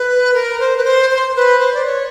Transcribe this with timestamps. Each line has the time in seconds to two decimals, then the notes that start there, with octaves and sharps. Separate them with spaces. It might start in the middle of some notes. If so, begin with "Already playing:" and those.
Already playing: B4
0.34 A#4
0.60 C5
0.77 B4
0.85 C5
1.10 C5
1.36 B4
1.60 C5
1.74 D5
1.86 C#5